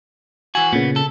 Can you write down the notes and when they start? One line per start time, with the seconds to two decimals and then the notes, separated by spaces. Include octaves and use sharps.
0.55 E3 F#4 G#5
0.73 A#2 C#3 B3
0.96 A4